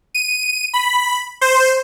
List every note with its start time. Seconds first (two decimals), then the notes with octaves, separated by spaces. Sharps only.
0.15 D#7
0.74 B5
1.41 C5